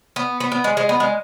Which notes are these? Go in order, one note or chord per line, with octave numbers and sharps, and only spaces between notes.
B3
B3
B3
G#3
G#3
B3
G#3